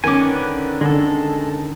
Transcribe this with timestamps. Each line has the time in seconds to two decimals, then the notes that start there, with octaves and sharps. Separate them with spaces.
0.04 D#3 C#4 G#5 D6
0.21 D3 B4 D5
0.81 D3 G#3 A4